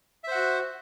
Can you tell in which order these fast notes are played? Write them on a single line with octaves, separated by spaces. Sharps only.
E5 C5 F#5 F#4